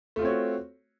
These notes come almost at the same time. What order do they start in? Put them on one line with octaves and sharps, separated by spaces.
A3 F4 C4 C#5 F#4